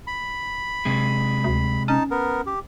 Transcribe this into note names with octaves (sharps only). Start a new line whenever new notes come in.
B5
C3 G#3
D2
C#4 D#4 A5
B3 A#4
G4